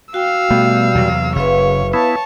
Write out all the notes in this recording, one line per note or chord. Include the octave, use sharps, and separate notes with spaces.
F#4 F5 G5 E6
B2 G3 A3 B3
E2 C3 F#3
F#1 C#3 B4 C#5 E5 F5
B3 E4 C#5 A5